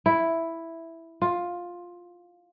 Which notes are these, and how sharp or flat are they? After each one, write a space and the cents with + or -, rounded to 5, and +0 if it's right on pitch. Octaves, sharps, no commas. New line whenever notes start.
E4 +0
F4 +10